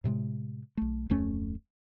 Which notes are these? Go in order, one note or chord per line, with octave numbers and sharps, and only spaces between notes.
A2 C3 G3 G#3
B1 A3
D1 F2 A3 C#4